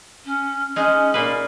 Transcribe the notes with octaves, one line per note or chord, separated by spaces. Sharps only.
C#4
G#3 C#4 D#4
A#2 A#3 B4